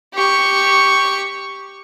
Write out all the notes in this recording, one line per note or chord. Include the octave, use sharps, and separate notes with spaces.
G4 C#6